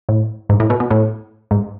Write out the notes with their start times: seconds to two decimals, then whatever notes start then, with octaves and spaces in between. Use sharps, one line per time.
0.09 A2
0.49 G#2
0.60 A2
0.70 B2
0.80 B2
0.91 A2
1.51 G#2